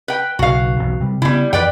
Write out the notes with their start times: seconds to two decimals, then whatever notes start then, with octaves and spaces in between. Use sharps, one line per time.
0.08 B4 G5
0.39 B1 C#3 F#4 F5
0.77 B1 E2
1.01 C3 G3
1.22 C#3 G3 G#3 B3 E4
1.53 F2 E3 B4 D5 G5